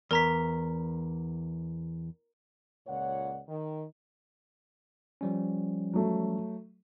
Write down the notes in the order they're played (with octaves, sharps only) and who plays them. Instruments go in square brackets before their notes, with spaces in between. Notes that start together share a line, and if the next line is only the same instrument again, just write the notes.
[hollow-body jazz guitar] E2 [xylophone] A#4 A#5 B6
[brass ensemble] C#2 A#2 C#5 D5 F#5
D#3
[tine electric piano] F3 G3 C#4
[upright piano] F#3 A3